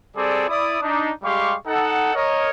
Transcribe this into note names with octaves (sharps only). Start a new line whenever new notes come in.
G3 C4 G#4 A4 D5
E4 D5 D#6
D4 D#4
G3 G#3 G4 F5 C6 C#6
D#4 A4 F#5
A#4 C#5 D#5